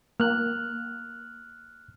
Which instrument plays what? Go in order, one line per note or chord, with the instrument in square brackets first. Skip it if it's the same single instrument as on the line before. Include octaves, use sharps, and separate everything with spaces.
[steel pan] A#3 [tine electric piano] F6 F#6